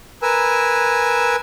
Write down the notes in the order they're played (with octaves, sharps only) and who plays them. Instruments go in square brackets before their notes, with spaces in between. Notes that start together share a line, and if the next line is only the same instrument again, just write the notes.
[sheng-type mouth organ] A#4 B4 G#5 E6